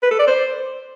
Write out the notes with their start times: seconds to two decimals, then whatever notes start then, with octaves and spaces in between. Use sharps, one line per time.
0.03 B4
0.11 A4
0.19 D5
0.27 C5